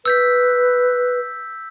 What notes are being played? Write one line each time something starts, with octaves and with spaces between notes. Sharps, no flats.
B4 E6 G6 B6